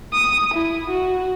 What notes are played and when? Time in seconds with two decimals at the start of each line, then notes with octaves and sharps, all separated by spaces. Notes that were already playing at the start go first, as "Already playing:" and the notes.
0.13 D#6
0.54 E4
0.90 F#4